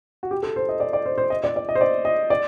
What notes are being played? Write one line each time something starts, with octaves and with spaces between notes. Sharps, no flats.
F#4
G4
A4
C5
D#5
D5
D5
C5
C5
D#5
D5
D5
D#5
C5
D5
D#5
D5